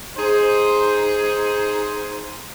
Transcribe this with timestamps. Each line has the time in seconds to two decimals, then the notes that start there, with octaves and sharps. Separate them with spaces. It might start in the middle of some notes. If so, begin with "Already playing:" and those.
0.17 D#4 G#4 C5